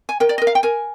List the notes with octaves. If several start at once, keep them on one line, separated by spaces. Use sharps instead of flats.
G#5
A#4 G5
D5
D#5
A#4
F5
G5
A#4 G#5